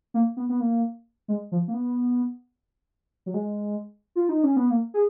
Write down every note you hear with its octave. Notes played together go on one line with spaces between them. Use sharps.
A#3
B3
B3
A#3
G#3
F3
A#3
B3
F#3
G#3
F4
D#4
C#4
B3
A#3
G#4